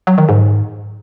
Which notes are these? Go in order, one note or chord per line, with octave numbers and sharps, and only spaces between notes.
F#3
D#3
G#2